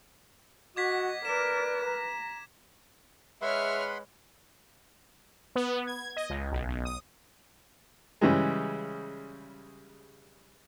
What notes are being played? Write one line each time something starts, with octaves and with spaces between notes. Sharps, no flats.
F#4 D#5 F#5 D6 G#6 B6
A#4 B4 D5 E7
A#5
G#3 B4 C#5 E5 F#5 B5 C6 F6
B3
G#6
D#5
C#2
B1
B1
D#6
C#3 E3 G3 G#3